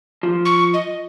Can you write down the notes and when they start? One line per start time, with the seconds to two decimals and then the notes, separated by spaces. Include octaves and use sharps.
0.23 F3
0.45 C#6
0.74 D#5